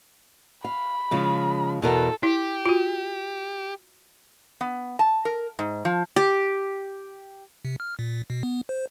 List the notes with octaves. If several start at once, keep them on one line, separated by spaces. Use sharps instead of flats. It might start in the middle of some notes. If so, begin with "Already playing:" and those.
F5 B5
C#3 F3 G#3
E2 B2 A4 A#4
E4 G4
F4 F#4
B3
A5
A#4
G#2
F3
G4
C3
F6
A#2
B2
B3
C5